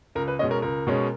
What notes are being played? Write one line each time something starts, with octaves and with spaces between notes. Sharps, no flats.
C#2 A#4
B4
B2 G#3 C#4 D#5
A#4
C#2 A#4
B2 G#3 C#4